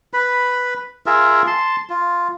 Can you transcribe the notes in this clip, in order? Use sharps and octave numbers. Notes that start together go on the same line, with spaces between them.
B4 B5
F4 G#4 A#4 E5
A5 C6
F4